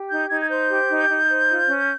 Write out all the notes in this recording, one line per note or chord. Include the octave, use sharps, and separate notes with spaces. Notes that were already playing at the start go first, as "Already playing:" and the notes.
Already playing: G4
D#4 G6
D#4 G#6
G#6
C5 G6
G4
D#4
D#4
C5
F4
C#4